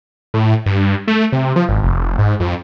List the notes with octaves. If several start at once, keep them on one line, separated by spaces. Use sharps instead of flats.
A2
G2
A3
C3
F3
G#1
F1
G#2
F2